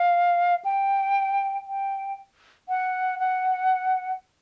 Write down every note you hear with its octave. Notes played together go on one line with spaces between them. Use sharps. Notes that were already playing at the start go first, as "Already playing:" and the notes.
Already playing: F5
G5
G5
F#5
F#5